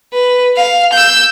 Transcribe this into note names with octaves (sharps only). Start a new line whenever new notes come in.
B4
F5
E6 G6